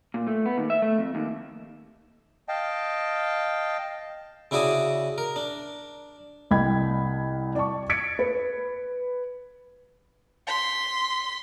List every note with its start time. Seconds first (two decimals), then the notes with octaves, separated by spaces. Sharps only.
0.14 A#2
0.27 A3
0.46 B3
0.58 D#2
0.70 E5
0.82 A3
0.98 F2
1.15 D#2
2.48 D#5 F5 G5 A5
4.51 C#3 E4 F#4 D5 A5 D#6
5.18 A#4
5.36 D4
6.51 C2 D#5 G5 B5 G#6
7.55 D5 A5 C#6
7.90 G#6 A6 B6 C#7 D7
8.19 B4
10.47 C6 B6